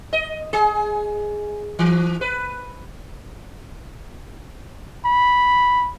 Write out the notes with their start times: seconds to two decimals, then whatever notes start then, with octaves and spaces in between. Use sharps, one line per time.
0.13 D#5
0.53 G#4
1.79 E3
2.21 B4
5.05 B5